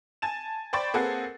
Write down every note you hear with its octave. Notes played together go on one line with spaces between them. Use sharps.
G#5 A5 A6 E7
C5 D5 G5 B5 C#6 A6
A#3 C4 G#4 A4 B4 F#5